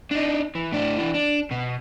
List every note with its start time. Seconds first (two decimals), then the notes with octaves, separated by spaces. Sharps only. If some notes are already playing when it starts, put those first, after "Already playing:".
0.11 D4 D#4
0.55 E3
0.72 A2 D4
0.98 E3 D4
1.14 D4
1.51 B2